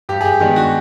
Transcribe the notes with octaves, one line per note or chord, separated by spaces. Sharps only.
G2 G4
G#4
G4
D#3 G#3 B3 D4 G4
F#4